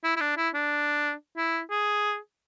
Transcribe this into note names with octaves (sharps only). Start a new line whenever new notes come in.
E4
E4
D4
E4
D4
E4
G#4